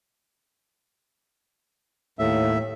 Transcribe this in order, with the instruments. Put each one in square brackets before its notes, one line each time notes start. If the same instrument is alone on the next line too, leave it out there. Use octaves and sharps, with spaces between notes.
[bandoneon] D#2 E5 [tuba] A2